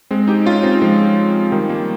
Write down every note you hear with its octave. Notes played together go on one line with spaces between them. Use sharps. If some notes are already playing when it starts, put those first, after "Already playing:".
G#3 C4
D#4 G4
C#4 F4
C4 D#4
F3 G#3
D#3 G3
G3 A#3